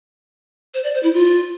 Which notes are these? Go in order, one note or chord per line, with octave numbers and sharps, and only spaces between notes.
C5
D5
C5
E4
F4